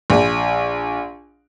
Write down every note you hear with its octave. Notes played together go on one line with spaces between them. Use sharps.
A#1